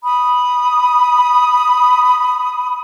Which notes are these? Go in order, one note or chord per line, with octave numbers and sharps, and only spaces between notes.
B5 D#6